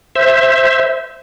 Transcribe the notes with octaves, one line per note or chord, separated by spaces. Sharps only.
C5 E5